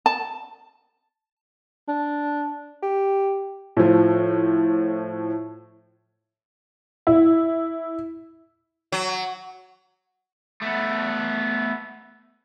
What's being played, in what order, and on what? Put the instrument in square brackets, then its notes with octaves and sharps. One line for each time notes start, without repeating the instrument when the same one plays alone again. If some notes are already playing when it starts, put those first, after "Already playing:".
[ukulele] A5
[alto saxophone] D4
[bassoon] G4
[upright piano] A2 F3
[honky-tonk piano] E4
[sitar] F#3
[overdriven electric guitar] A3 B3